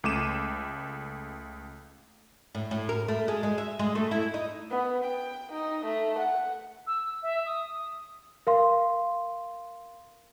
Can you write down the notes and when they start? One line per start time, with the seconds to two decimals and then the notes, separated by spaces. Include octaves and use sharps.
0.04 C#2 A3 D6 D#7 E7
2.55 A2
2.71 A2
2.89 A#4
3.08 A3
3.28 G#3
3.43 G#3
3.58 E5
3.79 G#3
3.95 A3
4.11 E4
4.34 D#4
4.70 B3
5.04 G5
5.52 D#4
5.86 A3
6.19 F#5
6.87 E6
7.23 E5
7.46 D#6
8.47 A#4 F5 C6